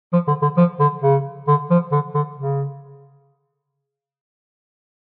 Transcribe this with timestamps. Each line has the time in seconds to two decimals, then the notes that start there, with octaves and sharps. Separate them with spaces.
0.13 F3
0.28 D3
0.42 D3
0.57 F3
0.80 D3
1.02 C#3
1.48 D3
1.70 F3
1.92 D3
2.15 D3
2.37 C#3